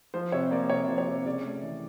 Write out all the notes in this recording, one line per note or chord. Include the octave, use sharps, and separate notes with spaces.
F3 C5
C3 C#5
A#3 D5
C3 C#5
F3
C#5
C3
C#3 D5
A3
E3